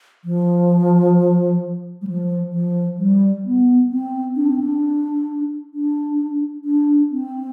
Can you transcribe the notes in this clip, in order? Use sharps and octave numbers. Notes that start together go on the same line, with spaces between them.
F3
G3
F3
F3
G3
B3
C4
D4
C4
D4
D4
D4
C4